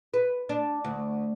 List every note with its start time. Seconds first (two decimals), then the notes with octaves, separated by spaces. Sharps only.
0.14 B4
0.49 D4
0.84 D2